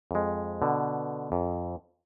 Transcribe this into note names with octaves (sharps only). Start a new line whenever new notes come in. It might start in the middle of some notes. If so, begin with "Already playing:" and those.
F2 G#3
B2 D3
F2